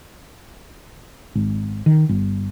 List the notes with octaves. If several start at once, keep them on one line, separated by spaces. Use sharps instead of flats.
G#1
D#3
G1